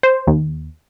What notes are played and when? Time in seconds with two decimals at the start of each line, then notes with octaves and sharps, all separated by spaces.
0.03 C5
0.27 D#2